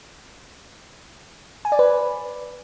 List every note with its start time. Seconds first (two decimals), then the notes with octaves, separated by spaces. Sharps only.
1.65 G#5
1.72 D5
1.79 B4